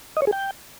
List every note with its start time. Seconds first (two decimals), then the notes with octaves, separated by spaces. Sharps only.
0.17 D#5
0.22 C#5
0.27 G#4
0.32 G5